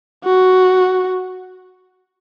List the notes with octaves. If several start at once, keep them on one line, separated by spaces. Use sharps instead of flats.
F#4